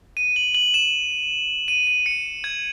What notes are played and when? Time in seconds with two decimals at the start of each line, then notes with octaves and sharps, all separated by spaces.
0.17 D#7
0.36 F#7
0.55 F#7
0.74 E7
1.68 D#7
1.87 D#7
2.06 C#7
2.44 G#6